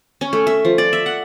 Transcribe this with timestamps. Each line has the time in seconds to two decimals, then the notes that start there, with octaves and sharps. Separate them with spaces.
0.21 C#4
0.33 A3
0.47 E5
0.65 F3
0.78 D5
0.93 E5
1.06 F#5